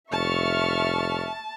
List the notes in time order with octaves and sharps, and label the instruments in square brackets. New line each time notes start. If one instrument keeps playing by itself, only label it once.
[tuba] F1 [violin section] E5 C#6 F6 [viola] A5